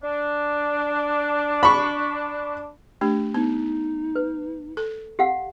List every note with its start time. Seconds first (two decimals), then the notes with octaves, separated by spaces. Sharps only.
0.03 D4
1.63 B5 C#6
3.01 A3 D4 G4
3.34 B3 D#4
4.16 B4
4.77 A4
5.19 G4 F5 F#5